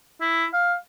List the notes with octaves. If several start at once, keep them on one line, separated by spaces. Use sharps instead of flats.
E4
F5